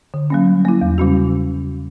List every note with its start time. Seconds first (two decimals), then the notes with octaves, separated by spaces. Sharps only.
0.14 D3
0.30 F#3 A#3 C#4
0.47 G3
0.65 A#3 E4
0.81 E2
0.98 C#3 G3 C#4 F#4